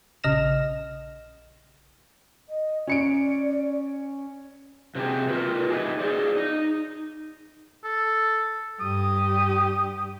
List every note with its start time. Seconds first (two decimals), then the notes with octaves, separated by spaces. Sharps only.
0.24 A#1 C#3 D#5 F6 A#6 E7
2.49 D#5
2.87 C#4 D5 C#7 D7
4.95 C3 C4 G4 G#4
5.29 F4 A#4 B4
5.70 D#4 E4 G4 G#4 G#5
6.00 G#4 C5 D5
6.37 D#4
7.84 A4
8.81 G2 G4 D#6